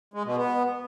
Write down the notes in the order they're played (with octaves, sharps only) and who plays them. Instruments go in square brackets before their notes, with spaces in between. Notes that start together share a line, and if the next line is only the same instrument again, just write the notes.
[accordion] G#3
B2
B3